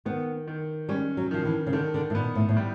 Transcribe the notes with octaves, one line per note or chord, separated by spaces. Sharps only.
D#3 B3
D#3
G3 C#4
F#3
D#3 F3
E3
C#3
D3 D#3
D3
A2
A#2 B3
A2
A2
G3